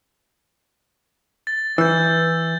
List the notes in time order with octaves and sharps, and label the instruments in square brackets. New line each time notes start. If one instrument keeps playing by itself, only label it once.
[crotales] A6
[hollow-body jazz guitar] E3 [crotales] E6 G6